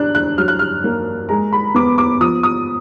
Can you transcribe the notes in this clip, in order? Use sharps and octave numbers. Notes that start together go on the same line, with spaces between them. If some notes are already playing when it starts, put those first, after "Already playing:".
Already playing: D4 F#6
F#6
F#3 F6
F#6
F6
A#3
G#3 A#5
B5
B3 D6
D6
F3 D#6
D#6